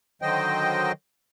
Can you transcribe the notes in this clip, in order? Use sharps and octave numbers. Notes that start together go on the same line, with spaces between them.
D3 D#3 F#3 C5 D#5 G5